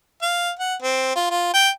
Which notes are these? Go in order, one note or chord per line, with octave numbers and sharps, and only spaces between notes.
F5
F#5
C4
F4
F4
G5